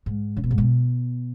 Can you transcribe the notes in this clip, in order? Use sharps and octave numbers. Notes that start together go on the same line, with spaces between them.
G#2
C#3
B2
G#2
B2